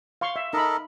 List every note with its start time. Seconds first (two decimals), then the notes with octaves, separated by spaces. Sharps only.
0.21 F5 C6 C#6
0.36 E5
0.53 D#4 A4 A#4 D#5 B5